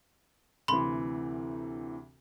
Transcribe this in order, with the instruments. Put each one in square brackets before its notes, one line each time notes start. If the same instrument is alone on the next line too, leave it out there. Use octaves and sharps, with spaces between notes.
[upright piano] D2 C3 E3 [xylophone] B5 C6